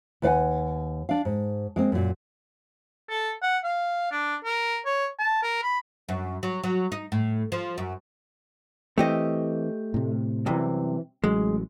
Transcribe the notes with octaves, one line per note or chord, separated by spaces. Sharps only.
D#2 B4 D5 F5 F#5 G#5
D4 F5
G#2
G#3 A#3 C4
F#2 A#2
A4
F#5
F5
D4
A#4
C#5
A5
A#4
B5
F#2
F#3
F#3
D#4
A2
F3
F#2
E3 A3 C4 G4 D#5
A2 C3
C2 F#2 C3 E3 C4
A1 F#3 G#3